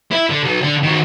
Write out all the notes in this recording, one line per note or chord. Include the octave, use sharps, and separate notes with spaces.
E4
D3
B1 F#3
D3
D#3 F#4